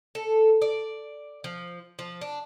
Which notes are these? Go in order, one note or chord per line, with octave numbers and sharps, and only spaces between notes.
A4
D5
F3
F3
D4